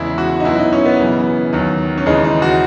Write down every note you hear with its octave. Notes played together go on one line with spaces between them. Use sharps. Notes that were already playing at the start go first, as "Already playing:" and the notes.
Already playing: E2 C#3 G#3 E4
F#4
D#4
C#2 B2 F#3 E4
D#4
C#4
B3
F#2 C#3 E3
D#2 D#3 F#3
C#4
D#2 C#3 E3 G#3 D#4
D#4
F#4